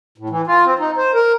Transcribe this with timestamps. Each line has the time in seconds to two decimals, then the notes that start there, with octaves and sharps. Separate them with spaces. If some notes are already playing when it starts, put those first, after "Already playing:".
0.18 A2
0.30 E3
0.47 F4
0.65 C4
0.79 D#4
0.97 C5
1.14 A#4